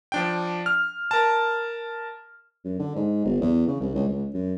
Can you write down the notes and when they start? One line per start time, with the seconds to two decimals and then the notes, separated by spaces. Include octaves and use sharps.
0.12 F3 D4 G5
0.66 F6
1.11 A#4 A5
2.64 F#2
2.79 D3
2.96 G#2
3.25 G1
3.41 E2
3.67 C#3
3.80 C2
3.95 C#2
4.08 C#2
4.34 F#2